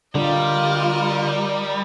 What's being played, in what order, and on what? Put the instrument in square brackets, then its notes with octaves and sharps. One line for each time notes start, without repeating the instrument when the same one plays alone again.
[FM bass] D3 [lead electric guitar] G3 [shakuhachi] F4 [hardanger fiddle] A#4 D#5